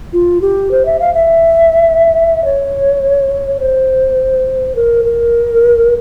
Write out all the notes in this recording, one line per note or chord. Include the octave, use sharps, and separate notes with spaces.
F4
G4
C5
E5
F5
E5
C#5
C5
A#4
A#4